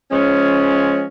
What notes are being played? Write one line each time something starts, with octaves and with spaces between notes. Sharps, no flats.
F3 G#3 C#4